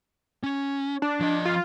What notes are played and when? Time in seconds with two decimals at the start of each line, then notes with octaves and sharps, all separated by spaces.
0.43 C#4
1.02 D4
1.20 F3 D#5
1.45 F4